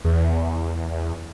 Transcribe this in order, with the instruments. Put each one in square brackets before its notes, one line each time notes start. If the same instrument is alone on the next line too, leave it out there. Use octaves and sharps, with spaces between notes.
[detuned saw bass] E2